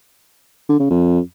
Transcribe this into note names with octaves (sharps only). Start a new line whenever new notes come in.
D3
C#3
F2